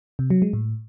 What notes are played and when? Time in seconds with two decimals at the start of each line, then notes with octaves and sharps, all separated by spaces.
0.19 C3
0.30 F#3
0.42 G#3
0.53 A2